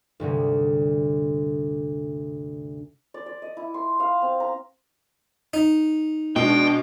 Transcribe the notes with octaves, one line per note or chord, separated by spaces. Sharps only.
D2 G2 C3 G#4
D5
D5
D#5
E4
C6
F5
C4
A#5
D#4
B2 G#3 D4 G5